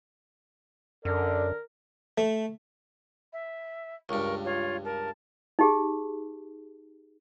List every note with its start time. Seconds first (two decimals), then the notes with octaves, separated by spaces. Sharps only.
1.05 F#2 D3 A#4 D5
2.18 A3
3.33 E5
4.09 C#2 G2 A#4 C#6
4.45 F4 C#5
4.84 A#4 A5
5.59 D#4 G4 G#4